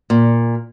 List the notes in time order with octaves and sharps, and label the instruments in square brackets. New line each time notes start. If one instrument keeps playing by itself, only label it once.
[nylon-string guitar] A#2